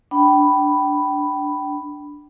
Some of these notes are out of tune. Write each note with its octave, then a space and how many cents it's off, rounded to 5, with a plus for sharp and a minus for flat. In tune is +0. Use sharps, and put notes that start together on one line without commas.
D4 +0 G5 -25 B5 +0